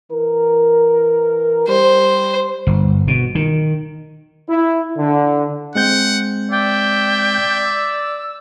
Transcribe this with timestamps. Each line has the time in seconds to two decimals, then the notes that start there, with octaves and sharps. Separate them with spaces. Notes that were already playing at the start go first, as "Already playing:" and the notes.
0.10 E3 A#4
1.68 G3 C5
2.67 G1
3.08 B2
3.35 D#3
4.49 E4
4.96 D3
5.75 G#3 C4 F#5 G6
6.51 D5 E5 G5
7.65 E6